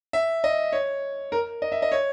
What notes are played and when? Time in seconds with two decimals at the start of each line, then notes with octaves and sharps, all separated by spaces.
0.13 E5
0.44 D#5
0.72 C#5
1.32 A#4
1.62 D#5
1.72 E5
1.82 D#5
1.92 C#5